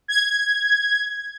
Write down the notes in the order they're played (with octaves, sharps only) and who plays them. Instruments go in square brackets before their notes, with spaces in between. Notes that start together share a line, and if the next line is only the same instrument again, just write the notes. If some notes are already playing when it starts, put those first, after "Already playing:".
[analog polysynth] G#6